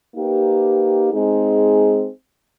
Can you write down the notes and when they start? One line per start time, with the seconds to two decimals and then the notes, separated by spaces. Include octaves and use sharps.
0.14 A#3 D#4 G4 B4
1.12 G#3 C4 D#4 G#4